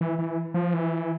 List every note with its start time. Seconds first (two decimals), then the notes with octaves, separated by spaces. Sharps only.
0.01 E3
0.19 E3
0.54 F3
0.73 E3